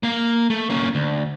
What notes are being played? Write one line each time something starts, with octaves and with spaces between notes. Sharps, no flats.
A#3 F5
A3
A#3 C#4
D2